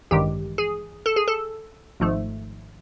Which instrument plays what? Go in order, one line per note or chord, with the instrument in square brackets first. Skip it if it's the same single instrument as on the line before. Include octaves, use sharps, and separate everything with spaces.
[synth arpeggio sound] A1 G2 D#3 G#3 G4
G#4
A4
G#4
A4
G#1 G#2 F3 A3